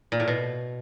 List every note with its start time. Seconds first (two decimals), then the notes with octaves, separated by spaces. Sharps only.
0.12 A#2
0.20 A2
0.28 B2